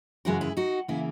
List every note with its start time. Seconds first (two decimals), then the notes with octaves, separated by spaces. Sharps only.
0.25 F#2 C#3 E3 G#3 F#4 A#4
0.41 E4 G#4
0.57 D#4 F#4
0.88 C#3 E3 A#3 E4